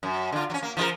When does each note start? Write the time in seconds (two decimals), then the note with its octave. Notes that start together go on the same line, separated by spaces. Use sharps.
0.03 F#2
0.32 D3 F4
0.50 F#3 C#4
0.63 A#3
0.77 F3 E4 A#4